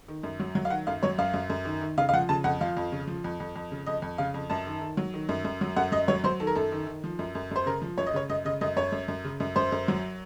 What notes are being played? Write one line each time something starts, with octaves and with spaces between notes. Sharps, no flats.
D#3
F#2
F#3
F#3
F5
D#3 F#5
F#2 F5
F#3 C#5
F#2 F5
F#2
F#2
D#3
D#3
C#3 F5
F5
F3 F#5
C#3 A5
F2 F#5
F3 F5
F2
C#3
F3
F2
F2
F2
C#3
F2 D#5
F2
C#3 F5
F2
F#2 A5
D#3
D#3
F#3
D#3
F#2
F#2
F#3
F#2 F#5
F#2 D#5
F#3 C#5
F#3 C5
D#3 A4
A#4
F#2 A4
D#3
D#3
F3
F#2
F#2
F#2 C5
C#3 A#4
F3
F#2 C#5
D#5
C#3 C#5
F#2 D#5
C#3 D#5
F#2 D#5
F#2 C#5
F#2
F#2
C#3
F#2
F#2 C5
F#2
F#3